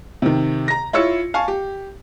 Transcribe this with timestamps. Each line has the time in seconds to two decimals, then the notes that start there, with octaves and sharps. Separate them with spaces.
0.22 C3 D#3
0.68 A#5 A#6
0.93 E4 F4 C#5 E6 C#7
1.34 F5 G#5 A5 C#6
1.48 G4